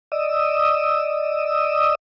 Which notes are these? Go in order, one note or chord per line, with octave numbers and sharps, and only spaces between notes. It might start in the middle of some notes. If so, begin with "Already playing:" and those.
D5 D#5 D#6 E6